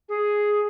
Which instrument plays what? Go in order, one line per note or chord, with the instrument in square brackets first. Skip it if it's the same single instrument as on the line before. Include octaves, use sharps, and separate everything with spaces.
[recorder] G#4